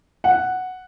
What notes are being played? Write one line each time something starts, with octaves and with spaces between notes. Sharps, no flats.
F#5